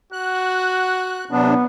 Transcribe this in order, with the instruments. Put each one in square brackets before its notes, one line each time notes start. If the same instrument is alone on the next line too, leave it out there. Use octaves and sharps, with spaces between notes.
[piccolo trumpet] F#4 [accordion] F#6
[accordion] C3 F#3 D4 [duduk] B3